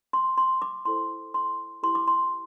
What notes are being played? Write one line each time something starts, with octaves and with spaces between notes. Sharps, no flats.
C6
C6
D6
E4 A4 C5 C6
C6
E4 G4 B4 C6
D6
C6